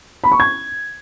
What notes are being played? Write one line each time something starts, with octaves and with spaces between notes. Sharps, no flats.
B5
C#6
G#6